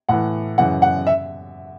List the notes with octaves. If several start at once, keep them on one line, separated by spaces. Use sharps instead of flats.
A2 E3 F#5
F#2 C#3 E3 F#5
F#5
E5